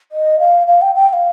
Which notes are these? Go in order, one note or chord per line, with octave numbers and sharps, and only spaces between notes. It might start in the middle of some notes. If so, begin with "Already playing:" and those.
D#5
F5
F5
G5
G5
G5
F5